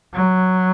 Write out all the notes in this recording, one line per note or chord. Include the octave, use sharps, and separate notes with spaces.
F#3